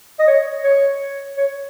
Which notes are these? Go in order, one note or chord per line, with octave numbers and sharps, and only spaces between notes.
D#5
C#5
C#5
C#5